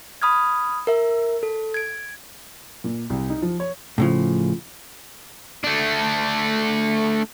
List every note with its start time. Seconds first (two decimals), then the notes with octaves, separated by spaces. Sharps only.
0.22 B5 D#6 F6 G#6
0.87 A#4 E5
1.43 A4
1.74 G#6 D7
2.84 A#2
3.10 C2
3.30 D#4
3.42 F3
3.60 C#5
3.98 A2 C#3 F3
5.64 A3 D4